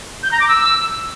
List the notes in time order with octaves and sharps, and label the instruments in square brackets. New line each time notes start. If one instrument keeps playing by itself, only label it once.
[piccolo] G6
A#5
D6
E6